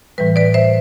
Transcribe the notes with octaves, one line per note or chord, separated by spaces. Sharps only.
A2 E3 G3 B4
B4 D5
C5 E5